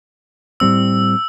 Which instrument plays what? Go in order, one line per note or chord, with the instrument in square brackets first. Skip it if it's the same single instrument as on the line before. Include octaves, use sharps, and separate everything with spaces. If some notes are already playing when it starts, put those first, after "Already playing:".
[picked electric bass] A2 G3 C4 [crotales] E6